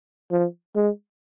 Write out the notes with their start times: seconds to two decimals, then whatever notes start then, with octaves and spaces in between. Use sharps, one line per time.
0.31 F3
0.76 G#3